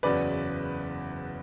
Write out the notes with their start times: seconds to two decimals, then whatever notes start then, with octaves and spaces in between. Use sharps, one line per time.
0.03 F#1 E2 C#3 F#3 C#4 B4 D5